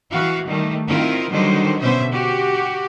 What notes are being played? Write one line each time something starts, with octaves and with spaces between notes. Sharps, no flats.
E3 F#4 F5
D#3 G3 A3
D#3 C4 E4 F4 A#4
D3 D#3 F#3 G3 D#4 C5
B2 D3 C#4 C5 E5
F#4 G4